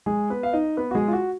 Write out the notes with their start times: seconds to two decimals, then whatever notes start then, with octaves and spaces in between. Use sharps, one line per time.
0.06 G#3 G#4
0.30 B3 B4
0.43 F5
0.53 D#4 D#5
0.77 B3 B4
0.91 F#4
0.95 G#3 G#4
1.08 F4
1.13 F#4